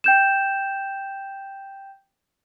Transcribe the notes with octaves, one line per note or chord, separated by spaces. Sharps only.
G5 G6 E7